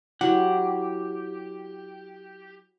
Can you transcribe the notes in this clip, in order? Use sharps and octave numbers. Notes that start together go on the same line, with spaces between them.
F#3 E4 G4 F#5